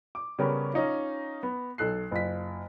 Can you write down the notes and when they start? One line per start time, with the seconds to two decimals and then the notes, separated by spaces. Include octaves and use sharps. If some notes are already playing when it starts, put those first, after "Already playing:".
0.15 D6
0.39 C#3 G3 B3 C#4 G4 A#4
0.73 C#4 D#4 F4
1.43 B3
1.78 B1 A4 F#6 C7
2.11 F#1 F4 B6